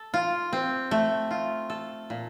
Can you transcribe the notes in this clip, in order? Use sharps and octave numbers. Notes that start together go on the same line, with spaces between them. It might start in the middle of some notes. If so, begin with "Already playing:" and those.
Already playing: A4
F4
C4
A3
F4
A4
A#2